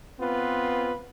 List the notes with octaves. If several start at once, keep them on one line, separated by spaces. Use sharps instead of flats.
B3 C4 F4 B4